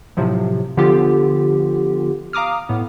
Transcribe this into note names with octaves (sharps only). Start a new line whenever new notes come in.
A2 C3 F3 F#3
D3 F3 B3 F4 G4
F5 A#5 D6 D#6 F6
A2 B3